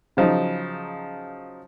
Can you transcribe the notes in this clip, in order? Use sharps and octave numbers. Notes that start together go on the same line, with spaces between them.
C#3 F3 F#3 D#4